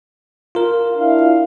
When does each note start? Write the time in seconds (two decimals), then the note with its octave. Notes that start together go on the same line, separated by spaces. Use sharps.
0.55 F4 A#4
0.95 D4 E4 F5